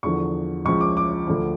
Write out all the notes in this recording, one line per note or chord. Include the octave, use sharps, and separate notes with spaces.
E2 D3 F3 C#6
C#2 C#3 F3 C#6
D6
D6
D2 D3 F3